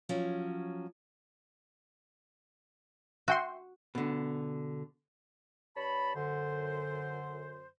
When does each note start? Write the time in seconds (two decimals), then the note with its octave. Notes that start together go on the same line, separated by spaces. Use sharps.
0.09 F3 F#3 C#4
3.28 F#4 E5 G5 C6
3.95 B2 D3
5.77 G2 C#5 A5 B5
6.16 F#2 D3 C5